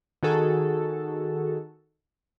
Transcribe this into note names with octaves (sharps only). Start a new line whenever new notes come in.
D#3 F#4 G#4 A4